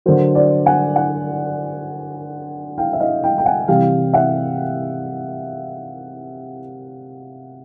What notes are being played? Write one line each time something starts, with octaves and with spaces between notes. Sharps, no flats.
D3 F#3 A#4 C5
C5 D5
F#5 G#5
F#5 G#5
F5 G5
E5
D#5 F5
F5 G5
G5
F#5 G#5
C3 E3 G3 F5 G5
E5 F#5